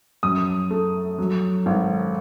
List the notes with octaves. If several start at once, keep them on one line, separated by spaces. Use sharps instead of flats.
F#2 D#6
A3
F#3
G#1